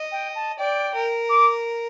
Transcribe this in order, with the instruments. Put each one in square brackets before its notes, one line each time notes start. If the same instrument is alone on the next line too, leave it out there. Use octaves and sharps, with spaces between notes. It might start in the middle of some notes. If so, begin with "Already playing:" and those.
Already playing: [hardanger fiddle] D#5
[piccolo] G5
A5
[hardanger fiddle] D5 [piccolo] G5
[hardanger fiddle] A#4
[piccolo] D6